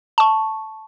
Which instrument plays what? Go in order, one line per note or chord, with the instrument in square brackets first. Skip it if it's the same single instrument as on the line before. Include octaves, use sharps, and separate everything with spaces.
[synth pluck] A5 C#6